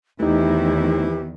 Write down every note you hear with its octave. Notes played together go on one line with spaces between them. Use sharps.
E2 D#3 E3 A3 C4 D#4 E4 G4